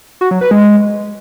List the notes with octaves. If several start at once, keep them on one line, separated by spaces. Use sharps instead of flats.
F#4
F#3
B4
G#3